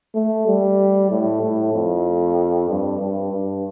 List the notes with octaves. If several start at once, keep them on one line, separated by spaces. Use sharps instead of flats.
A3
G3
A2
A2
F2
G2
G2
G2